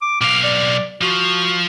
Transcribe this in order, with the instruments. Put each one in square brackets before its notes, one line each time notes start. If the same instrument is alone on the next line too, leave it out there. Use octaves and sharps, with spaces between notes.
[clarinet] D6
[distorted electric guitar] B1 F5 [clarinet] D6
[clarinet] D5
[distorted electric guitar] F3 [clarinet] F#4